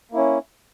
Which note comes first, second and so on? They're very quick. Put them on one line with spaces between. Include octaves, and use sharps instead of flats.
A#3 E4 C#4